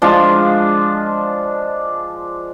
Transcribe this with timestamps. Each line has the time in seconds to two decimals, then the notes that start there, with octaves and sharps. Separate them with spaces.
0.02 F3 G#3 D4 F4